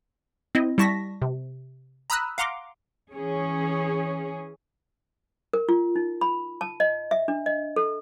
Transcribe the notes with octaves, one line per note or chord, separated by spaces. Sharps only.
C4 E4 D#5
G3 E4 A5 C#6 A#6 B6
C3
A#5 B5 D#6 E6 F#6
F5 F#5 A#5 C6 D6
E3 C#4 G#4 C#5
A#4
F4
D#4
B5
A5
D#5
E5
D4
D#5
A4